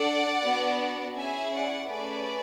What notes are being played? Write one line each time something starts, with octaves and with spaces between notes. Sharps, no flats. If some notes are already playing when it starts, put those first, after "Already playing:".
Already playing: D4 A4 D5 F#5
B3 D4 F#4
C#4 E4 G#4 E5 G#5
D5 F#5
A3 C#4 G#4 B4 D5